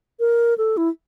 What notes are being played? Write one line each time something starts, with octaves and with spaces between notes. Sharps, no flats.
A#4
A4
E4